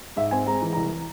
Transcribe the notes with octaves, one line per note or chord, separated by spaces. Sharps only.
G#2 E5
C4 G#5
G#3 A#5
E3
C2 A#5